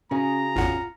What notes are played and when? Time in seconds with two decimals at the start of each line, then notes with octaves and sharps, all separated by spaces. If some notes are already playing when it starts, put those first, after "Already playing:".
0.11 C#3 C#4 F#4 G#4 A#5
0.56 G#1 E2 A2 F4 F#5